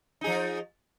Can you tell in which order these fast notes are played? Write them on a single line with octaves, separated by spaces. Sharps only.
D#4 G#4 F3